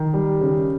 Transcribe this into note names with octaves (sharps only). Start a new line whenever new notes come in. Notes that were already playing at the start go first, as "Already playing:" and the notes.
Already playing: D#3
G3
C#3